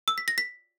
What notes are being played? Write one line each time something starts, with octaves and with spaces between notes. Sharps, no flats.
E6
B6
A#6
B6